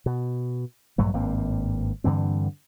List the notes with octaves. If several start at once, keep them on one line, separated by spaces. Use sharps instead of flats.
B2
A#1 G2 F#3 A3
G#1 G2 A#3 C4
G2 D3 E3 C4